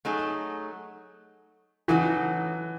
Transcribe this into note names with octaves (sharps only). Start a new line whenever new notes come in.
F#3 A3 D#4 G#4
C#3 E3 F#3 A3 D#4 F#4